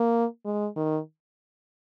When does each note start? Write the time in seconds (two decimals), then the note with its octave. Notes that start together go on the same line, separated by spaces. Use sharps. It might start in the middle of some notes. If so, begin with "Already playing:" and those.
Already playing: A#3
0.45 G#3
0.77 D#3